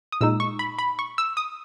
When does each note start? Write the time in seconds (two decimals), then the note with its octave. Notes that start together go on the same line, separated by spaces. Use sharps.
0.12 D#6
0.21 A#2 G#3 D#4 E6
0.40 C#6
0.59 B5
0.79 B5
0.99 C#6
1.18 E6
1.37 D#6